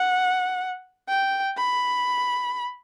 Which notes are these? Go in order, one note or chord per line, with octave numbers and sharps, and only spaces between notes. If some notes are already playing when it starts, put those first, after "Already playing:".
Already playing: F#5
G5
B5